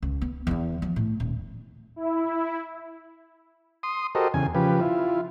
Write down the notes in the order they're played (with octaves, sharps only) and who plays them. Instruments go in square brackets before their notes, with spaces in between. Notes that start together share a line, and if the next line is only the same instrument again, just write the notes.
[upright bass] C#2
B3
E2 E3
F3
A2
D#1
[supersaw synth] E4
[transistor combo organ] C6 D#6
F#4 G4 A4 A#4 C5 D#5
E2 C#3 G#5
C#3 F3 G4 B4
E4 F4